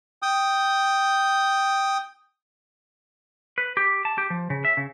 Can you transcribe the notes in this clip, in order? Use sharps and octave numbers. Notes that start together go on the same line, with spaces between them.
G5 D#6
B4
G4
A5
G4
F3
C#3
E5
C#3